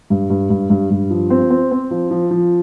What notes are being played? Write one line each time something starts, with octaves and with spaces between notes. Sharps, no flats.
G2
G2
G2
G2
G2
F3
C4
C4
C4
F3
F3
F3